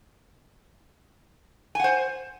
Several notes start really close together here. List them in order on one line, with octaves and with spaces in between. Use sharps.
G#5 F#5 C5